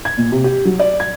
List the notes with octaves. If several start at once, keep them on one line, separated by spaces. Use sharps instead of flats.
G#6
A#2
C3
G4
F#3
D5
G#6